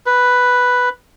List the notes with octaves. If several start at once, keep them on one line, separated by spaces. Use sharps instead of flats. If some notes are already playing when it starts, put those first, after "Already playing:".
B4